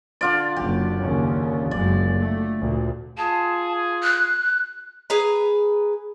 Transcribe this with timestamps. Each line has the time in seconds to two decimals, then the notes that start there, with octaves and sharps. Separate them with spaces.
0.21 D3 F4 D5
0.56 F#1 G4
1.00 D#2 C#3 C#4
1.71 F#1 F#2 G#3 D5
2.18 A3
2.59 D2 A#2
3.18 F4 G#4 A5
4.03 F#6
5.10 G#4 B4 A#5